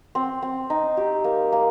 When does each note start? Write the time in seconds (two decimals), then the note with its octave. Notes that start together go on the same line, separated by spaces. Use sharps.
0.15 C4
0.42 C4
0.70 D#4
0.97 G4
1.24 A#3
1.52 A#3